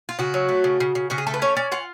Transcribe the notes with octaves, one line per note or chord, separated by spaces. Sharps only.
F4
C#3 F#4
F#3
A3
C#3
C#3
C#3
C#3 F#4
G#4
A3 A4
B4
C#4 C#5
C#4 D5
F4 F#5